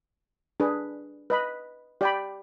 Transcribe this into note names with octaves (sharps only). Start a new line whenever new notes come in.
D4 G#4 B4
B4 D#5 B5
G4 D5 G5 B5